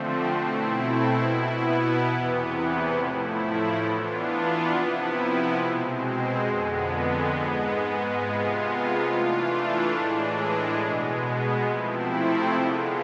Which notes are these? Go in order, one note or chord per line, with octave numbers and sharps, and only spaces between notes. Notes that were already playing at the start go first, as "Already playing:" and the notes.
Already playing: D3 F3 A3 C4
B2 A3 C4 E4
B2 B3 E4
E2 C3 E3 B3
A2 F3 A3 E4
E3 B3 D4 F4
C3 F3 B3 E4
B2 G#3 C4
F2 D3 G#3 B3
G#2 G#3 B3
C3 G#3 B3 F4
E3 A3 D4 F4
A2 E3 G#3 D4
B2 G#3 B3
C3 F3 A3 C4 E4
D3 G#3 B3 F4